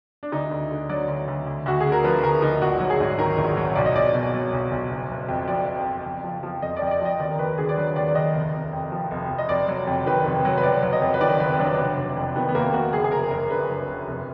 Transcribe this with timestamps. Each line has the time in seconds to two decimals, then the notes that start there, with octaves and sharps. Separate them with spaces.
0.23 D4
0.32 D2 D#4
0.51 D2
0.70 D3
0.89 F#3 D5
1.08 D2
1.28 D2
1.47 D2
1.66 D2 F#4
1.80 D3 G#4
1.92 A#4
2.04 F3 B4
2.23 D2 A#4
2.42 D2 D#4
2.62 A#1 F#4
2.80 F#3
2.90 G#4
3.00 G#2
3.19 D#3 A#4
3.38 A#1
3.57 F#3
3.75 B1 D5
3.86 D#5
3.95 B1 D5
4.14 B2
4.34 F#3
4.53 B1
4.72 B1
4.91 F#1
5.10 F#1
5.28 F2
5.48 F3 D5
5.67 F#1
5.86 F#1
6.05 F2
6.24 F3
6.43 F3
6.62 F2 D#5
6.76 D5
6.82 F2 D#5
6.91 D5
7.01 F3 D#5
7.19 D#2 D5
7.31 A#4
7.39 D#2 B4
7.58 D3 G#4
7.69 D5
7.77 F#3 B4
7.96 D#2 D5
8.08 D5
8.15 D#2 D#5
8.34 F1
8.54 F1
8.73 F2
8.92 F3
9.11 F1
9.30 F1
9.38 D#5
9.49 F1 D5
9.68 F#3
9.87 F2
10.06 D#3 B4
10.25 F1
10.45 F#3
10.58 B4
10.63 F#1 D5
10.83 F#3
10.93 D#5
11.02 F2
11.14 B4
11.21 D#3 D5
11.40 F#1 B4
11.59 F#3 D4
11.78 F1
11.97 F1
12.16 F2
12.36 D#3 B3
12.49 B3
12.55 F1 A#3
12.74 F1 F#4
12.93 F#1 G#4
13.04 G#4
13.12 F#1 A#4
13.31 F#2 A#4
13.50 D3 B4
13.69 F#1
13.88 F#1
14.08 F1